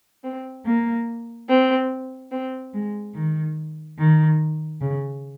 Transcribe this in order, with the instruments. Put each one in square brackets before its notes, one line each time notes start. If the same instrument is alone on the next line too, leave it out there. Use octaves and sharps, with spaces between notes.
[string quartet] C4
A#3
C4
C4
G#3
D#3
D#3
C#3